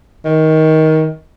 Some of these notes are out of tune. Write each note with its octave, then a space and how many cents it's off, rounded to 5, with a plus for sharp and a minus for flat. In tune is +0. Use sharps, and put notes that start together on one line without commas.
D#3 +20